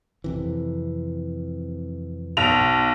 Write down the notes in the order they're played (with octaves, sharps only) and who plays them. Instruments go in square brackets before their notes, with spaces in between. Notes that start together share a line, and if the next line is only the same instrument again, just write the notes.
[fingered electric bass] F2 C3 E3
[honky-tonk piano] B1 F7